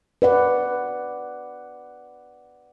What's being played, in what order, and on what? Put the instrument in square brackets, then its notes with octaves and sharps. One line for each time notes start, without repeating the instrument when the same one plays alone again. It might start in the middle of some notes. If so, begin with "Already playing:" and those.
[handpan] B4 D5 F#5